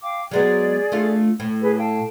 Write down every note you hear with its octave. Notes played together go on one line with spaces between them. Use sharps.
F5 G5 D6
F#3 G#3 B3 G#4 D5
A3 D4 F4
A2
G#4 B4
F5 G5 A5